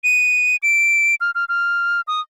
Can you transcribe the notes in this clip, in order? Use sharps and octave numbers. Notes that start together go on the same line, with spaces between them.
D#7
D7
F6
F6
F6
D#6